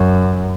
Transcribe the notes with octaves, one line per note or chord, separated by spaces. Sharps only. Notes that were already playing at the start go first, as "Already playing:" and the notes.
Already playing: F#2